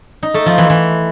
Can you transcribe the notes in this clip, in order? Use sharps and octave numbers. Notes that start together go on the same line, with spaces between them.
D#4
A3
F3
E3
E3